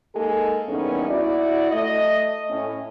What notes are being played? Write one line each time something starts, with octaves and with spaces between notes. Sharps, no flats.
G#3 A#3 D#4 G#4 A4
E2 G2 A#3 B3 C#4 D#4
E4 F#4 D5
A3 D#5
A2 C#4